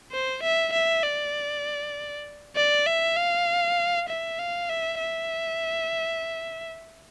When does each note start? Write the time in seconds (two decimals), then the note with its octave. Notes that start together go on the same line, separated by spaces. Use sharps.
0.12 C5
0.43 E5
0.73 E5
1.04 D5
2.56 D5
2.86 E5
3.17 F5
4.09 E5
4.39 F5
4.69 E5
5.00 E5